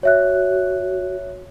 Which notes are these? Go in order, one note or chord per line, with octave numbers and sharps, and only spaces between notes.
F#4 C#5 E5 F#6